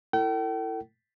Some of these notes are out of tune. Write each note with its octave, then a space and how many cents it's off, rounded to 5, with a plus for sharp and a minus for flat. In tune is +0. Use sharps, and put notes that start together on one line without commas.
E4 +20 A4 +40 G5 -40